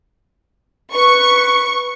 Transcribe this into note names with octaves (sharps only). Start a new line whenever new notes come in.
B4 C#6